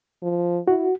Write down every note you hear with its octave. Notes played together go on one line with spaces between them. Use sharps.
F3
E4 F#4